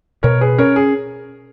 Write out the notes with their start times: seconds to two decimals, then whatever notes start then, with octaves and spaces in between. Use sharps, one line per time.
0.23 B2 A#4 C#5
0.41 G#4 B4
0.58 C#4 A#4 C#5
0.76 G#4